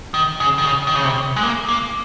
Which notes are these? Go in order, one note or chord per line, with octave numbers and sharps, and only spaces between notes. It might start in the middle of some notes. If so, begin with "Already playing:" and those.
D#3
C#3
D#3
C#3
D#3
C#3
C3
G#3
A#3
A#3